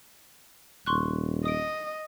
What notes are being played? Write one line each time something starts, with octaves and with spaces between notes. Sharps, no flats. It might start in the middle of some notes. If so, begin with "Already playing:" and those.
D#1 C6 C#6 F#6
D#5 D#6 D7